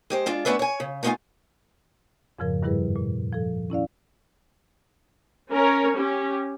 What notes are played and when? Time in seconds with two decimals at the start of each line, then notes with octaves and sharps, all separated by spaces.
0.10 G#3 G4 C5
0.26 G#3 D4 F4
0.45 A3 B3 C#4 D4 B4 E5
0.59 C#5 G#5
0.80 C#3
1.03 A3 B3 D4 D#4 F4 G#5
2.39 F2 G#2 C#3 F3 A#4
2.63 G2 D#3 G3 E4 G#4 B4
2.96 A#2
3.33 F3 A4
3.70 C#4 E4 D5 F5
5.50 C#4 A#4 C#5
5.94 C#4 G4